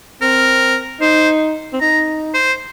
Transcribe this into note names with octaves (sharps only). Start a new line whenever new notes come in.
C4 A#4
D#4 C5
C4
D#4 A#5
C5